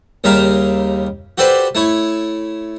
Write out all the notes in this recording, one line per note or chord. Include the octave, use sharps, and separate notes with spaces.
D#2 C#3 G3 E5 F5 A#5
F#4 G4 A4 B4 C5 D5
A3 E4 C#5